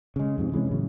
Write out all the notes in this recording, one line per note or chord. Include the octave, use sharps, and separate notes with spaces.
C#3 G#3
F2 G#2 C3
C3 E3 G#3 C#4
A2 C#3 F#3